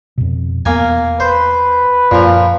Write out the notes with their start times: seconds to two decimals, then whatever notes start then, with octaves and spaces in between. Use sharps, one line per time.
0.18 F2 B2
0.66 E2 A#3 B3 G#5
1.20 B4 C5
2.11 F#2 A#2 F3